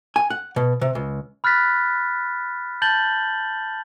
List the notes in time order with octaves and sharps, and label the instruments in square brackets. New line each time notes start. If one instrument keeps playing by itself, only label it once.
[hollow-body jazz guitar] G#5
F#5
B2
C3
C#2
[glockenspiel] B5 F6 F#6 A6 B6
A5 G6 A6 F#7 G7